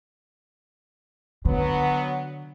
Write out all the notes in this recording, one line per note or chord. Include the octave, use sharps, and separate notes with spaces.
D3 F#3 B3